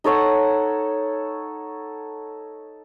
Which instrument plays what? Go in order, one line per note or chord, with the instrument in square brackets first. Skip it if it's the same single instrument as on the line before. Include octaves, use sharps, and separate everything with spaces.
[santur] D#4 A4 C#5 F#5